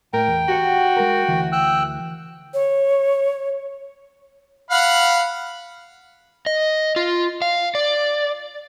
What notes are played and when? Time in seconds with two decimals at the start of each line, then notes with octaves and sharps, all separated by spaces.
0.13 A2 A#4 G5
0.28 E2
0.48 F#4 G4 F#5
0.97 G#3 A#4
1.28 D2 E3
1.52 G5 E6 F#6
2.54 C#5
4.71 F5 F#5 B5
6.46 D#5
6.96 F4
7.42 F5
7.75 D5